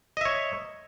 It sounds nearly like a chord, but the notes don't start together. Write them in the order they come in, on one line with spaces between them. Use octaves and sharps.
D#5 E5 C#5